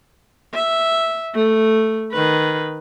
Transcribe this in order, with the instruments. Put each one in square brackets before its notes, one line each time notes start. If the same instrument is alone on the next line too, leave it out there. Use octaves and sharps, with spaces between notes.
[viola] E5
A3
D#3 B4